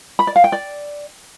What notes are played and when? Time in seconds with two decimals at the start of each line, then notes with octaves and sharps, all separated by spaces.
0.19 B5
0.27 D5
0.36 F5
0.44 G5
0.52 D5